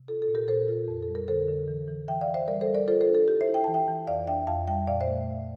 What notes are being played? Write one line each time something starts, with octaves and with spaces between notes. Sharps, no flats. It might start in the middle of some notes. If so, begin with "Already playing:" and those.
Already playing: C3
F4 A4
A4
A#2
G4 A#4
A#2 A4 C5
F4
F2
A4
G3
A#4
D3 A4 C5
D3
E3
E3
E3 E5 G5
D5 F5
E3
C5 E5
G3 A#4 D5
A4 C5
G3
A#4 D5
F4 A4 C5
A4 C5
D4
A4
E4 G4
C5 E5
E4
G5
E3 A5
E5 G5
E3
F2 D5 F5
D4 E5 G5
F2 F5 A5
G3 E5 G5
A#2 D5 F5
C5 E5
A3